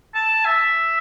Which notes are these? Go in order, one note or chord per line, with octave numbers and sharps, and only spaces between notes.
A5
E5